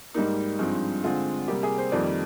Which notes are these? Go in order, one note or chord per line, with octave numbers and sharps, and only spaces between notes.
G#2 G3 A#3 D#4
G2 F3 G#3 C4
D3 G#3 C4 F4
C3 G3 A#3 G4
G#4
C5
F2 D#3 G3 A#3 D5